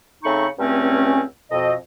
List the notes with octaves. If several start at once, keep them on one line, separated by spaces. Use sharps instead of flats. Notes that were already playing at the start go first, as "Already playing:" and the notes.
C#3 A3 C4 D#4 B5 C#6
C#2 G2 A3 C4 C#4
F2 B2 C4 D#5